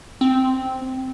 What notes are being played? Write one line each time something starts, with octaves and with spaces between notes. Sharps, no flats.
C4